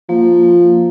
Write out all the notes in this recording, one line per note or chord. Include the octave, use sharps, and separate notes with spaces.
F3 A#3
A#3